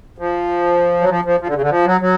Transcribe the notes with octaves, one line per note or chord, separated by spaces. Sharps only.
F3
F#3
F3
F3
F3
D3
C#3
D3
F3
F#3
F#3